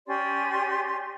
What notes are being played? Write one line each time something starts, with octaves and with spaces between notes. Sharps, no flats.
C#4 G4 D5 C6